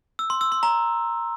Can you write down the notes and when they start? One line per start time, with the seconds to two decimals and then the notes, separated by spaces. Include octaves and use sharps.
0.19 E6
0.30 C6
0.41 E6
0.52 C6
0.63 A#5